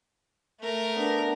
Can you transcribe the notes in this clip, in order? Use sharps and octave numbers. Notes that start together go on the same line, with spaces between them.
A3 A#4
B3 D4